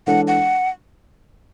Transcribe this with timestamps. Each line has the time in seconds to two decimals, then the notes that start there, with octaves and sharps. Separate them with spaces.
0.07 E3 G#3 D4 A4 C#5 F#5
0.28 F#5